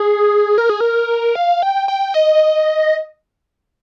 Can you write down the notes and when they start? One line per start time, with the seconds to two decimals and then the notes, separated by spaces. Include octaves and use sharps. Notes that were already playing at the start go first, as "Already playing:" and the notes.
Already playing: G#4
0.58 A#4
0.69 G#4
0.80 A#4
1.35 F5
1.62 G5
1.88 G5
2.14 D#5